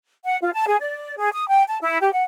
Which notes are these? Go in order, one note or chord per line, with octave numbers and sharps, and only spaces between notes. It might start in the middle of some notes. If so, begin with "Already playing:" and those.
F#5
F4
A5
G#4
D5
G#4
D#6
G5
A5
E4
G4
F#5